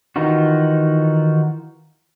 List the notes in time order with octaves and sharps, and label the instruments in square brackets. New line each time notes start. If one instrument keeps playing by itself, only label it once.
[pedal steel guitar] D#3 E3 D#4 F4 F#4